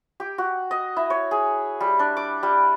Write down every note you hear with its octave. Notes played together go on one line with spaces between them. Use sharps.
G4
F#4
D#5
E4
C#5
G#4
G3
D4
D6
G3